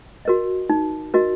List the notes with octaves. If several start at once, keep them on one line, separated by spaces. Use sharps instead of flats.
F#4 A#4 D#5
D#4
F#4 A#4 D#5